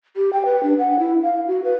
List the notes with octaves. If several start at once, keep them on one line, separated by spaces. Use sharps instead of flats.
G4
G5
B4
D4
F#5
E4
F5
F#4
B4